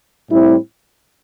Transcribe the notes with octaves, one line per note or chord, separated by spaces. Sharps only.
A2 G3 C4 E4